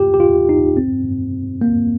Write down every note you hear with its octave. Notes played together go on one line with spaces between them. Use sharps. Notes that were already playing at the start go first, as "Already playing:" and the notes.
Already playing: F4 G4
G4
F4
D#4
C4
A#3